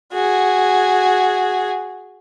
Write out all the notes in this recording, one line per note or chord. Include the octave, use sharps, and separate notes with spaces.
F#4 G#4